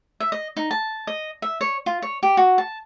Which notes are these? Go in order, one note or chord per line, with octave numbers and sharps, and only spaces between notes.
E5
D#5
D#4
A5
D#5
E5
C#5
F4
C#5
G4
F#4
A5